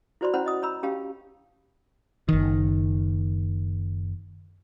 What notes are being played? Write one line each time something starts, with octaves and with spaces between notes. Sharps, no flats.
E4 F#4 C5 D5 B5 C6
C#4 E4 C5 F#5 B5
D#5 D#6
C#5 A#5 B5 E6
C#4 G4 F5 A5 B5
F#1 D#3